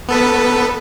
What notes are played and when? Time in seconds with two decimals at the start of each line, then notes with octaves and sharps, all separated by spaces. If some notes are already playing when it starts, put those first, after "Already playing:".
0.08 B3 A4 B4